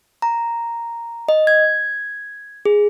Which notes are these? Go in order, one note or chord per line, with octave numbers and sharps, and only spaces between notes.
A#5
D#5
G#6
G#4